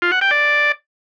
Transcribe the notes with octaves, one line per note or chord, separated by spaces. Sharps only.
F4
F#5
G5
D5